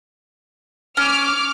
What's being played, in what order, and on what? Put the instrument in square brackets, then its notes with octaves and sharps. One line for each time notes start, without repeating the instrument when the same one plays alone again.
[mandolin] C#4 [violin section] D6 F6